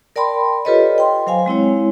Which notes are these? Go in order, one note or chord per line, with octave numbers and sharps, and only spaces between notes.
A#4 D5 G5 A5 B5 C6
F4 G4 A4 B4 C#5 D#5
G5 C6
F#3 C5 F5 G#5
G#3 C4 E4 C#5